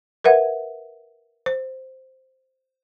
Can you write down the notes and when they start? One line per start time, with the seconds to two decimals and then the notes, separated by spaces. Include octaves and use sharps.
0.24 A#4 B4 E5 F#5
1.46 C5